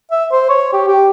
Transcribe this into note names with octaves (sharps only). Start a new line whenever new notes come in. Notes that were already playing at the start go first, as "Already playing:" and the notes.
E5
C5
C#5
G4
G4